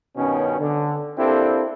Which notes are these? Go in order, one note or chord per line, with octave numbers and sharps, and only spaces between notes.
G2 B2 D#3 C#4
D3
A#3 C4 D4 E4 G4 A4